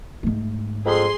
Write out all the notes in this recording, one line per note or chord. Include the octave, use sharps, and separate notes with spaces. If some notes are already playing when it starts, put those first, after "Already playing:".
G#2 A3
F2 G#4 C6